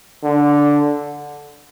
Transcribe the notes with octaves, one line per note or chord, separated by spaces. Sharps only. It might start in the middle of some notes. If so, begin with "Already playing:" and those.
D3